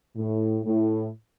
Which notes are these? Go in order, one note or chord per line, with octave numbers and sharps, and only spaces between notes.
A2
A2